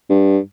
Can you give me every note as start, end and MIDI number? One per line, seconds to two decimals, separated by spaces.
0.10 0.39 43